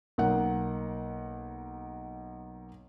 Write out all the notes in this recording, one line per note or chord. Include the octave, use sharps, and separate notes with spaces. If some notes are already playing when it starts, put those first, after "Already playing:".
B1 A#3 F#5